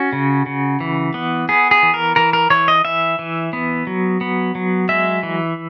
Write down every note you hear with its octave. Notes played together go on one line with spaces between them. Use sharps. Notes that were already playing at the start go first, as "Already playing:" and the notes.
Already playing: C#4 F#4
C#3
C#3
E3
B3
B3 G#4
G#4
E3
A#4
E3 A#4
A#4
E3 C#5
D#5
E3 E5
E3
B3
F#3
B3
F#3
G#3 E5
E3